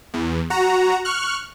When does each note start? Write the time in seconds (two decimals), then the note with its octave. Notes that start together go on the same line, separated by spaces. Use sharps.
0.14 E2
0.50 F#4 A#5
1.05 C#6 F6 F#6